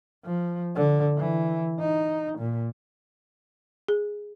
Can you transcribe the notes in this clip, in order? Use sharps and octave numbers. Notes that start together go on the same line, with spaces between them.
F3
D3
E3
D#4
A#2
G#4